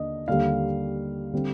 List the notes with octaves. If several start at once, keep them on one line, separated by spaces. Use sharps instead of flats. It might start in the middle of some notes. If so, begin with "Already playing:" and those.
Already playing: D#2 D3 D4 D#5
D#2 D3 G3 F5
D3 G3 C4